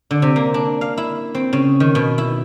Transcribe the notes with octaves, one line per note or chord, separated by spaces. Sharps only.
D3
C3
A#3
D4
F5
E4
C4
C#3
D#3
B2
E4